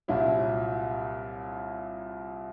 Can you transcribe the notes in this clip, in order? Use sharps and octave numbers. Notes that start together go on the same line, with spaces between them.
C2 A#2 F#3 E4